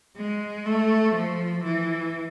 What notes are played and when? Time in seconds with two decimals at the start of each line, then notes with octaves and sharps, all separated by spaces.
0.16 G#3
0.66 A3
1.15 F3
1.63 E3